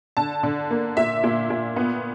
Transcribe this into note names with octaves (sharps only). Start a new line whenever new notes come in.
D3 A5
D3
A#3
A#2 E5
A#2
A#2
B3